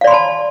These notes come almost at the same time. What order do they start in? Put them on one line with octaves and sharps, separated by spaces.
F5 D5 C6 B5 A5